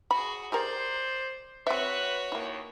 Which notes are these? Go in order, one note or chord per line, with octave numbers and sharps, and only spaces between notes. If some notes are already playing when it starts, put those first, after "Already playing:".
F#4 G#4 B5
G4 G#4 A#4 C5 D5
C4 F#4 B4 C#5 E5
D#2 A#3 E4